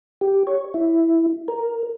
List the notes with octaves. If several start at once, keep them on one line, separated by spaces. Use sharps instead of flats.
G4
C#5
E4
A#4